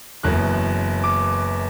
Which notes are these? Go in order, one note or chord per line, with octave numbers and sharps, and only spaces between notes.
F#1 F#2 E3 B3 F#6
D6